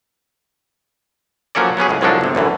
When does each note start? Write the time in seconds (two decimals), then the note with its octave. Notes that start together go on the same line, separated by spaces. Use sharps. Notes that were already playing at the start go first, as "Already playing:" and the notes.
1.55 F3 F#3 A#3 C#4 A4 D5
1.77 F#3 B3 C#4 G#4
1.89 C#2 A2
2.01 C2 F3 F#3 G#3 D4 A4
2.21 G1 C3
2.35 A1 F#2 D3 E3